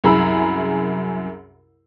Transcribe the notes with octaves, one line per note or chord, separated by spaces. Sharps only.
C2 F#2 G#4 A#5 B5 E6